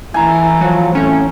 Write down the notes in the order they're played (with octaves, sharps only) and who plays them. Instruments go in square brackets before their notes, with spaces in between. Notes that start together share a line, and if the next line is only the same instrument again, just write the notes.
[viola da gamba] E3 A3 [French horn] E4 [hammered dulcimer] G#5 A#5
[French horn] F3 [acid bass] F#3
[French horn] A2 [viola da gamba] C4 [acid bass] C#4